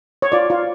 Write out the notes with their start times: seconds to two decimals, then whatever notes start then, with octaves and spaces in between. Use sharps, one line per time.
0.22 C#5
0.32 F4 D5
0.50 F4